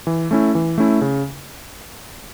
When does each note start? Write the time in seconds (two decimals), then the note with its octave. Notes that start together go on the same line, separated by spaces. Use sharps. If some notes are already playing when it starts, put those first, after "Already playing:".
0.07 E3
0.31 A3 C#4 E4
0.55 E3
0.78 A3 C#4 E4
1.01 C#3